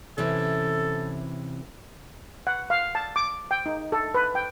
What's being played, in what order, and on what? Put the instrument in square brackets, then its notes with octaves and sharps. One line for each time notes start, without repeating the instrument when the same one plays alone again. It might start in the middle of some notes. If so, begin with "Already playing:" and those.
[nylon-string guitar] C3 E3 C#4 [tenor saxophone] A4
[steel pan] F#5
F5
A5
D6
G5
D#4
A4
B4
G5